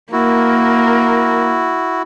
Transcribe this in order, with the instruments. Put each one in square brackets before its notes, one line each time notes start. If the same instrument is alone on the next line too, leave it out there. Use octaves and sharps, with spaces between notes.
[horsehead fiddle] A#3 A#4 [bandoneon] E4 F#4